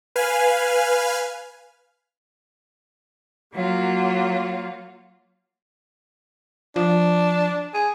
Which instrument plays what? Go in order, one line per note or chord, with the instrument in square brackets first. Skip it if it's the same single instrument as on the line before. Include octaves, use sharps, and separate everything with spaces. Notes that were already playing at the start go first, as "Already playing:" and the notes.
[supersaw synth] B4 F5 G#5 F6
[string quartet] F#3 A#3 F4 F#4
[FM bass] F3 [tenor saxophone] D4
[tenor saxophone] G#4